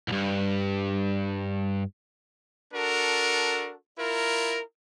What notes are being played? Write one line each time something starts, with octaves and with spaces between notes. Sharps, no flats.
C2 G2
D4 F#4 A4 A#4
E4 F4 A#4